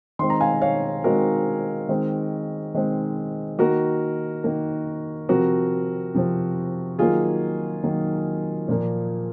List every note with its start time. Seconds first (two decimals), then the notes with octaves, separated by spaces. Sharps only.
0.19 D#3 G#3 C4 C6
0.30 A#5
0.41 F5 G#5
0.62 C#5 F5
1.04 D#3 G#3 C4 F#4 A#4
1.89 D#3 G#3 C4
2.74 D#3 G#3 C4
3.59 D#3 A#3 F#4 A#4
4.44 D#3 A#3
5.29 C3 F3 C4 F#4 A#4
6.14 C3 F3 C4
6.99 D#3 F#3 A#3 F4 G#4
7.84 D#3 F#3 A#3
8.68 A#2 F3 A#3